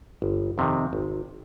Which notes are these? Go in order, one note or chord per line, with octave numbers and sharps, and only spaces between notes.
G1
F2 C3 D#3
G#1